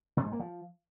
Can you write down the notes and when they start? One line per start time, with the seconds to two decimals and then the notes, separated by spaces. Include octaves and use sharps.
0.17 C3
0.24 G#2
0.32 A#3
0.39 F3